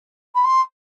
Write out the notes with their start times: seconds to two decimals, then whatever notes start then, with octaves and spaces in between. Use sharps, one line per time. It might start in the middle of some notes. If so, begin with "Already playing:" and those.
0.35 B5
0.44 C6